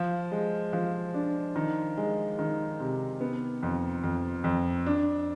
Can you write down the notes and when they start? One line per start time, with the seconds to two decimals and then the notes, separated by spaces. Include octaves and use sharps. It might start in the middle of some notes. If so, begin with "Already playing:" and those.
Already playing: F3
0.32 G#3
0.73 F3
1.14 D4
1.56 D#3
1.98 G#3
2.39 D#3
2.80 C3
3.21 B3
3.63 F2
4.04 F2
4.44 F2
4.86 D4